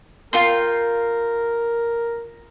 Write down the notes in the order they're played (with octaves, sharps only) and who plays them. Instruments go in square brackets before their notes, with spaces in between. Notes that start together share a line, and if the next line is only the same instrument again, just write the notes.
[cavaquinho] F4 G5 C6 [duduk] A#4